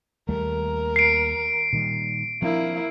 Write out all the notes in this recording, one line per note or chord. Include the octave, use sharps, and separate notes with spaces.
D#2 G3 A3 A#4
C7 D7
A#2 D#3 G3
F3 A#3 C4 D4 E4